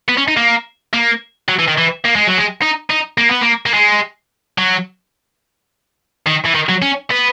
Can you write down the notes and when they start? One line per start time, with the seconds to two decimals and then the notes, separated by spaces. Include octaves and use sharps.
0.09 B3
0.18 C#4
0.28 D#4
0.37 A#3
0.94 A#3
1.49 F#3
1.59 E3
1.68 D#3
1.78 E3
2.05 A#3
2.16 G#3
2.27 F#3
2.38 G#3
2.62 D#4
2.90 D#4
3.18 A#3
3.29 B3
3.41 A#3
3.66 A#3
3.74 G#3
4.58 F#3
6.26 D#3
6.45 E3
6.55 D#3
6.69 F#3
6.82 C#4
7.11 B3